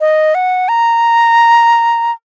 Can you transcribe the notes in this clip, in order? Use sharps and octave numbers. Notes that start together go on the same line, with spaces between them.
D#5
F#5
A#5